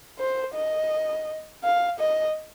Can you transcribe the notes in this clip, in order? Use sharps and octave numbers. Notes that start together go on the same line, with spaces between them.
C5
D#5
F5
D#5